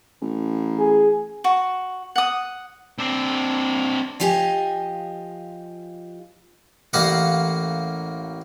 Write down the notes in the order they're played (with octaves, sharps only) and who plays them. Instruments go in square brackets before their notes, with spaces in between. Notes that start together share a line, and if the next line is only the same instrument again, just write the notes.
[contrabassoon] A1
[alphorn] G#4
[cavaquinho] F#4
F#5 D#6
[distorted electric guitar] C4 D4
[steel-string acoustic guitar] F3 F4 G4 D#5 G#5
[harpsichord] A1 A#3 F5 F#5